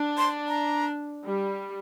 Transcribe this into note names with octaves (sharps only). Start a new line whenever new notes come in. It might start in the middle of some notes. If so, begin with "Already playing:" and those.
Already playing: D4
C6
A#5
G3